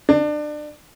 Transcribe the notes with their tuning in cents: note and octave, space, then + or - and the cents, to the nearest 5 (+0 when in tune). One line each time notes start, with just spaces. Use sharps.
D4 +30